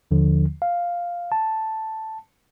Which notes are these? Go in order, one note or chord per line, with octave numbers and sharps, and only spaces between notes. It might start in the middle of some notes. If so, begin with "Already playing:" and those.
D#2 D3 F3
F5
A5